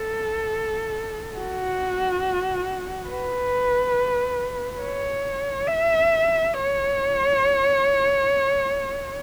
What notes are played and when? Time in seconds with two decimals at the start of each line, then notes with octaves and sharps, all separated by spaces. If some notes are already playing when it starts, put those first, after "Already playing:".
Already playing: A4
1.37 F#4
3.09 B4
4.81 C#5
5.67 E5
6.54 C#5